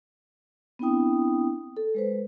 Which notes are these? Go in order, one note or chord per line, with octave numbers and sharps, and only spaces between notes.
B3 C4 D4 E4 G5 D#6
A4
G#3 B4 C5